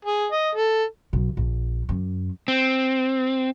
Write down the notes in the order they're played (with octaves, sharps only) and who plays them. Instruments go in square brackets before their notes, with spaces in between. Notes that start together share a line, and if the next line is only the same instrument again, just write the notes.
[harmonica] G#4
D#5
A4
[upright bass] B1
A#1
F#2
[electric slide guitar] C4